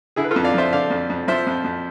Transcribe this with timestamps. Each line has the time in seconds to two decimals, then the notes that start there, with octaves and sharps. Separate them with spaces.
0.16 D3 E4 G#4
0.24 B4
0.31 F4 A4
0.36 F2
0.44 D5 F5
0.54 F3 C5 E5
0.72 D3 D5 F5
0.90 F2
1.09 F2
1.28 F3 C5 E5
1.46 F2
1.64 F2